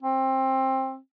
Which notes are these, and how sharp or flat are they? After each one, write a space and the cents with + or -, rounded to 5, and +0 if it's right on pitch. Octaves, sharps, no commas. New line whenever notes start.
C4 +20